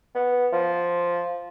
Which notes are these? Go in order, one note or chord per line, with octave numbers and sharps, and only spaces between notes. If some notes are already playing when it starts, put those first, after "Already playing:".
B3
F3